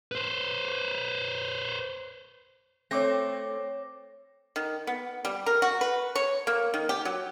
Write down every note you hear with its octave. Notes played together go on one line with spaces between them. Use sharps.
B4 C5
A3 C4 C#5 D6 A#6
D#3
B3
G3
A#4
F#4
B4
C#5
A#3
D#3
G4
F#3